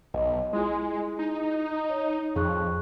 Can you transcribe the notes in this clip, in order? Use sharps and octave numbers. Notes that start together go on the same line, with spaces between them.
B1 D#5
G#3 E4 F4 G#4
D#4
C#5
F2 G#4 C#6 F#6